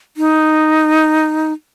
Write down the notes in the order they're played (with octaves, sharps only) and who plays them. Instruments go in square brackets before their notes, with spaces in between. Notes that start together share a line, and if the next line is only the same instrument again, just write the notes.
[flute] D#4